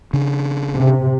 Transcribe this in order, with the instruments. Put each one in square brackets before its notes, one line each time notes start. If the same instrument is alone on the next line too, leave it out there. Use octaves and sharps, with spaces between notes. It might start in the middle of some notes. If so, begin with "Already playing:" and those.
[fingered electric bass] C#3 D4
[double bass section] C3